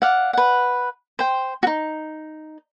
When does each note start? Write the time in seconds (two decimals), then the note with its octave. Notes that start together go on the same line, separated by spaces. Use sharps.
0.02 D5 F5 F#5
0.33 B4 F#5
1.19 C5 G5
1.63 D#4 F#4